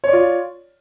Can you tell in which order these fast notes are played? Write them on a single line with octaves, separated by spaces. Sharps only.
C#5 D5 F4